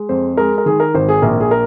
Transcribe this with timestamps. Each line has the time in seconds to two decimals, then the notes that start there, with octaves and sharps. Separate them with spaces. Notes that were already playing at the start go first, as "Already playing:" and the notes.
Already playing: G#3
0.09 F2 C5
0.37 G#3 A#4
0.58 A#4
0.66 D#3 G#4
0.80 A#4
0.95 G#1 C5
1.09 G#4
1.22 A#1 A#4
1.40 G#4
1.51 A#4